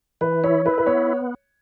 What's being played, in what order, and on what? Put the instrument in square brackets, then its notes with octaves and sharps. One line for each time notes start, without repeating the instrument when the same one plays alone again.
[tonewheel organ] E3 [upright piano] B4
[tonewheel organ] E4 [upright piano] C#5
[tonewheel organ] E4 [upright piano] B4
[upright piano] B4
[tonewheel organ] B3 [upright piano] C#5